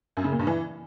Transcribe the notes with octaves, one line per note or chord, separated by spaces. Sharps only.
F#2
C#3
A#2
G2
E3